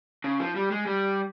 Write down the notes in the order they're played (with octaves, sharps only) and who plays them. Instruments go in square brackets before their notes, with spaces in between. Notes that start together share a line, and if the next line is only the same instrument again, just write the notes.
[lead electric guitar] C#3
F3
G3
G#3
G3